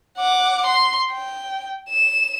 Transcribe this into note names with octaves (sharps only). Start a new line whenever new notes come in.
F#5 D6
C6
G5
E7